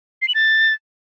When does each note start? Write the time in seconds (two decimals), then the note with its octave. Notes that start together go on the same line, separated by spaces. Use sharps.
0.22 C7
0.28 F#7
0.35 A6